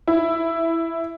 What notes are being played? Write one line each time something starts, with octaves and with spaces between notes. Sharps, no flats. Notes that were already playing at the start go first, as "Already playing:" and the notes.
E4